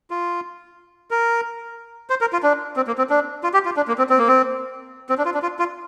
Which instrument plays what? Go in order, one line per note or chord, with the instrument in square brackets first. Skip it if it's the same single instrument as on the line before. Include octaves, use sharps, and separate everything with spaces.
[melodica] F4
A#4
C5
A#4
F4
D4
C4
A#3
C4
D4
F4
G4
F4
D4
A#3
C4
C4
A#3
C4
C4
D4
F4
D4
F4
F4